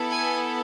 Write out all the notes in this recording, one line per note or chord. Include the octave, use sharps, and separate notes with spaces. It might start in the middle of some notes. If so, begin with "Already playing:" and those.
Already playing: B3 E4 A4
G#5